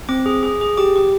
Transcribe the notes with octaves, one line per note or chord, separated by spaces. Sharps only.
C4 D6
G#4
G#4
G#4
G4 D6
G4